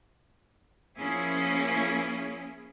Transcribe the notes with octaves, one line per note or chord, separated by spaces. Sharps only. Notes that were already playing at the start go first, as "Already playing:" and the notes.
F3 A#3 C#4 E4 G#4